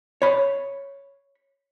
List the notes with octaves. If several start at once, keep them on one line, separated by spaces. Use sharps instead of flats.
C#5 B5